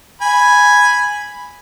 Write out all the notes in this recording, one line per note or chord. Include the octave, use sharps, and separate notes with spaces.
G#5 B5